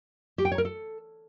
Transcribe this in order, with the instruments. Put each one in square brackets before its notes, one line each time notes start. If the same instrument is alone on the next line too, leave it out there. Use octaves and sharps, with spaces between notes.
[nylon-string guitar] G4
G5
C#5
A#4
A4